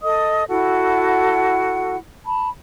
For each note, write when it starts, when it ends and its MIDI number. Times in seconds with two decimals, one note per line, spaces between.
0.02 0.44 69
0.02 0.44 75
0.02 0.44 87
0.48 1.97 64
0.48 1.97 66
0.48 1.97 69
0.48 1.97 78
2.25 2.49 81
2.25 2.49 83